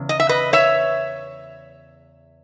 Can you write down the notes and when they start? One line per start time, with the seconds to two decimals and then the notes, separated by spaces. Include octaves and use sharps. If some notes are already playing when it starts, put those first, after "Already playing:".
Already playing: E2 C#3
0.09 D#5
0.20 E5
0.29 B4 D#5
0.53 C#5 E5